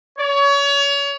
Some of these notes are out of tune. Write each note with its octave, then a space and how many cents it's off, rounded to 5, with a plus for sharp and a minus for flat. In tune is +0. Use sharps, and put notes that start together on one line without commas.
C#5 +30